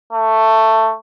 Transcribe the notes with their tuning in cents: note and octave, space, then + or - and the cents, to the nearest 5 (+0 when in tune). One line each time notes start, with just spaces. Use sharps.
A3 +10